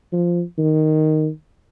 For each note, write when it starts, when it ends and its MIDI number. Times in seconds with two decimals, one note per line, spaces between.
0.12 0.42 53
0.58 1.29 51